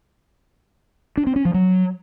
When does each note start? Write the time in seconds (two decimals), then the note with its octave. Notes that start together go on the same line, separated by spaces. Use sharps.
1.17 D4
1.27 C4
1.36 C#4
1.45 F3
1.54 F#3